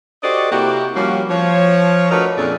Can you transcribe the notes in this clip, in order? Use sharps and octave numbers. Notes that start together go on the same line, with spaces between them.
F#4 G4 A4 C5 D5 D#5
C3 A#3 E4 F#4 G4
F3 G3 A#3 C#4 F#4
F3 C#5
A3 D4 F#4 A#4 B4 D#5
F2 A#2 C#4 D4 G#4 A4